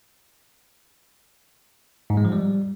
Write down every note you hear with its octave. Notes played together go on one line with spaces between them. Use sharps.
G#2
G#3
F3
G3